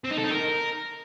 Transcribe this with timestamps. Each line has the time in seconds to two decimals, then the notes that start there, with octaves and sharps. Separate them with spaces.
0.04 C4
0.11 D#4
0.17 A4
0.24 D#4
0.31 A#4